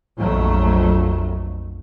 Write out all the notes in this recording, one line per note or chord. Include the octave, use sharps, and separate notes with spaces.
A#1 F2 F#3 A3